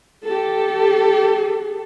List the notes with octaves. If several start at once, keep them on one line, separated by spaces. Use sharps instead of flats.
G4 A4